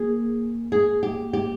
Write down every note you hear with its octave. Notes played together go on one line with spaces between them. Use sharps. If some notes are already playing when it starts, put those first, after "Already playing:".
Already playing: A#3 G#4
G#4
G4
G4